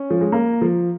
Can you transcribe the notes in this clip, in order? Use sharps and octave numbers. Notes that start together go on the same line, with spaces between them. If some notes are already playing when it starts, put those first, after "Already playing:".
Already playing: C#4
F3
G#3
A#3
F3